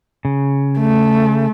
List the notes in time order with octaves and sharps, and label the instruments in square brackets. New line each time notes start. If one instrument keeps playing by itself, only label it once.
[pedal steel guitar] C#3
[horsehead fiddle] A3